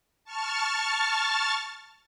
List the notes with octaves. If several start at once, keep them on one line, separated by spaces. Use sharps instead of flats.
A5 C#6 F6 A6